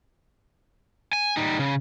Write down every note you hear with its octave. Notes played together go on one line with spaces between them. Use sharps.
G#5
G3 D#4
C#3